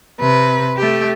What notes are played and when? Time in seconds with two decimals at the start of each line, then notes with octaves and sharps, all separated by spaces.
0.20 C3 B4
0.77 A3 G4